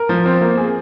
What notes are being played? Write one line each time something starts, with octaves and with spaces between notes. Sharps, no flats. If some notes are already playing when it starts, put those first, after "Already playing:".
Already playing: A#4
F3
C4
A#3
G#4